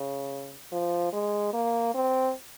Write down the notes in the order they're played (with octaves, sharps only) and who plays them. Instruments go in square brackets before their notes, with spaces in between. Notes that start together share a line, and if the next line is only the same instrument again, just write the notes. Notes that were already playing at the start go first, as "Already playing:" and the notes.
Already playing: [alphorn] C#3
F3
G#3
A#3
C4